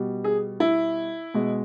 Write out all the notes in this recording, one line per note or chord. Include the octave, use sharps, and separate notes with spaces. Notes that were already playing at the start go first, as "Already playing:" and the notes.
Already playing: B2 G3
G#4
E4
B2 G#3